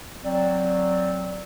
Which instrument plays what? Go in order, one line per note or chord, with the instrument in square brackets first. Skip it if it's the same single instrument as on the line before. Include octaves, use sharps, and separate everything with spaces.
[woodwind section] F#3 C4 [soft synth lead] D5